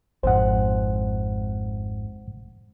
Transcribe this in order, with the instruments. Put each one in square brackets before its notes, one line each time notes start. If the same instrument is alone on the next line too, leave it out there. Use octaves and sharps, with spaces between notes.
[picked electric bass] G#1 F2 G#2 [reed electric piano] C5 F#5